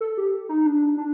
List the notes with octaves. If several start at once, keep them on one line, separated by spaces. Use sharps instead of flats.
A4
G4
D#4
D4
D4